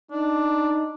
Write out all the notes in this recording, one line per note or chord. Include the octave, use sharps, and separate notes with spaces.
D4 D#4